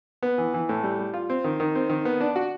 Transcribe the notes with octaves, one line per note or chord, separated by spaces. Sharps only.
B3
E3
E3
A2
G3
G3
F4
C4
D#3
D#3
C4
D#3
B3
D4
F#4